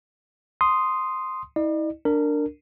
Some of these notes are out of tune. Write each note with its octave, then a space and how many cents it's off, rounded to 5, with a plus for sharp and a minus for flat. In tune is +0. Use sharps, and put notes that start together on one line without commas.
C6 -5 D#6 +0
E4 -45 D5 +45
D4 +0 A#4 -20